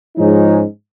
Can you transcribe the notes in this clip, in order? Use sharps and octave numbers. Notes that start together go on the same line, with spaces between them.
G#2 F3 G#3 C#4 D#4